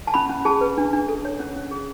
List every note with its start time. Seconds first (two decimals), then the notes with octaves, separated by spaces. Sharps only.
0.07 A5
0.14 C#4 B5
0.29 C#4
0.45 G#4 A5
0.61 B4
0.78 D4
0.93 D4
1.08 A4
1.25 C#5
1.40 C#4
1.56 C#4
1.71 G#4